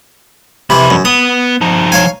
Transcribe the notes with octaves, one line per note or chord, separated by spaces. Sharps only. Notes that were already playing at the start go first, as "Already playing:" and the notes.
F2 C3 E3 B5
F#2
B3 D#6
F3 D#4
C#5 F5 G#5